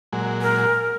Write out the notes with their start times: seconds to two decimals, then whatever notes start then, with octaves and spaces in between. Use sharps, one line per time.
0.13 A#2 F#3 G#3
0.42 A#4